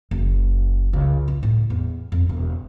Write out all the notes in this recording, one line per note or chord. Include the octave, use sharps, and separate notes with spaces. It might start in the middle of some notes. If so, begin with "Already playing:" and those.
F#1
C#2
F4
A2
E2
F2
E1